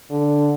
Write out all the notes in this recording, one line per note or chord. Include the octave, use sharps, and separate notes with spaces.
D3